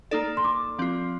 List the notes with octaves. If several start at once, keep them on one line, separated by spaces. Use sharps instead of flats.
A#3 D#4 A4 D5
C6
D6
F3 C4 F4